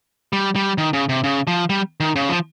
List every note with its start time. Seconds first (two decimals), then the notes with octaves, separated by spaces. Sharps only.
0.33 G3
0.56 G3
0.78 D#3
0.93 C#3
1.09 C3
1.24 C#3
1.47 F3
1.70 G3
2.00 D#3
2.16 C#3
2.29 F3